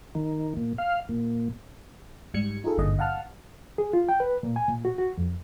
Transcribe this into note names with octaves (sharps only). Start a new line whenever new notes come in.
D#3
A#2
F5
A#2
G#2 G3 G#6 C#7
D#4 F4 G#4 A4
G#1 G2 A#2 D3 D#5
F5 F#5 A5 F6
G#4
F4
G5
B4
A#2
G#5
A#2
F#4
F#4
F2